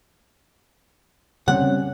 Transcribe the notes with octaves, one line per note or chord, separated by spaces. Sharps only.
C#3 G3 C4 C#4 F#5